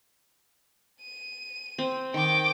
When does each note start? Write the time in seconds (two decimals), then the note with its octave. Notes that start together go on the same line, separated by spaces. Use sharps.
1.02 D#7
1.78 C4
2.14 D#3 G5 D6